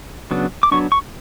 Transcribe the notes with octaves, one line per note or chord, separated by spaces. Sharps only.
C#3 F#3 B3 D4
D6
F#3 B3 D4 C#6
C#6